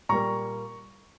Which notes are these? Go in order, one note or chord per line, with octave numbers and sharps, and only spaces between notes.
A#2 G3 A#3 A#5 C#6